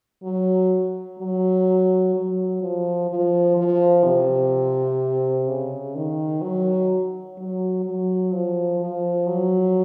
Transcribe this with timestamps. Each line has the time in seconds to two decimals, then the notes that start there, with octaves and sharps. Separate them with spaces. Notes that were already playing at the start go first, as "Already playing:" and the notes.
0.23 F#3
1.20 F#3
2.14 F#3
2.61 F3
3.09 F3
3.57 F3
4.04 C3
5.48 C#3
5.95 D#3
6.42 F#3
7.38 F#3
7.85 F#3
8.33 F3
8.80 F3
9.27 F#3